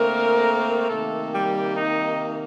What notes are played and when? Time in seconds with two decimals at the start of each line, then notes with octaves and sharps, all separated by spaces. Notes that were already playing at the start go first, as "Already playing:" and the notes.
Already playing: D3 A3 A#3 C4 A#4
0.89 C3 D#3 A3 A#3 A4
1.33 G3 G4
1.77 D#4